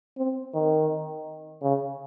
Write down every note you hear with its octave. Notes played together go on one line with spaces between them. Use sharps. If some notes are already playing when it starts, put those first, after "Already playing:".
C4
D#3
C#3